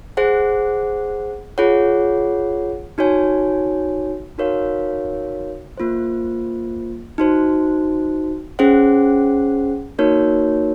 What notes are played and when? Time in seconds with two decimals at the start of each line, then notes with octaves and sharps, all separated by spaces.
0.17 G#4 C5 F#5
1.58 F4 G#4 C#5 F#5
2.98 D#4 F#4 C#5 G#5
4.38 D#4 F#4 A#4 C#5 F5
5.77 A#3 F4 C5
7.18 D#4 F#4 C5
8.59 C#4 G#4 C5 F#5
9.99 A#3 D#4 F#4 A#4 C#5